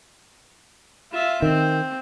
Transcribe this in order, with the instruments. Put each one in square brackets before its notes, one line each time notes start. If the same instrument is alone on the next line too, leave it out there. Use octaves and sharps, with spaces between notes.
[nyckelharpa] F4 E5
[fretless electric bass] D#3 [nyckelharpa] C4